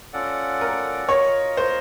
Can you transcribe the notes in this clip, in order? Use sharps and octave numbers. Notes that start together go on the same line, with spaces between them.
C#4 F4 A4 D5 F#5
A#4
F4 A#4 C#5 D#5
C5